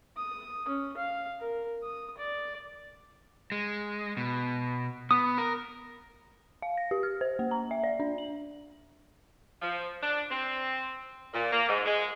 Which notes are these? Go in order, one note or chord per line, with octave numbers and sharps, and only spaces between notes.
D#6
C#4
F5
A#4
D#6
D5
G#3
B2
B3 D#6
A#4
F5
A#6
G4
F6
C5
A#3
A#5
E5
D5
D4
F#7
F3
D4
C4
A#2
A#3
G#2
G#3